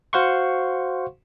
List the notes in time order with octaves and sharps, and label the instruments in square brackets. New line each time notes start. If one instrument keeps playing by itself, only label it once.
[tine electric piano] F#4 C5 F5 F#5 C6 C#6